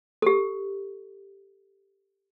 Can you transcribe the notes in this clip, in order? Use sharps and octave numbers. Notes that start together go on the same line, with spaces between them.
G4 A4